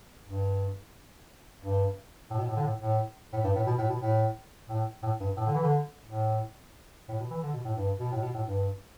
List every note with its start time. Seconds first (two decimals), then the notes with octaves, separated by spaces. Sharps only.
0.25 G2
1.62 G2
2.31 A2
2.38 B2
2.47 A2
2.56 D3
2.64 A2
2.81 A2
3.33 A2
3.44 G2
3.56 A2
3.67 B2
3.79 A2
3.89 B2
4.01 A2
4.69 A2
5.03 A2
5.21 G2
5.37 A2
5.46 D3
5.55 E3
5.63 D3
6.05 A2
7.09 A2
7.20 B2
7.30 E3
7.43 D3
7.53 B2
7.65 A2
7.77 G2
8.00 B2
8.11 A2
8.22 B2
8.34 A2
8.44 G2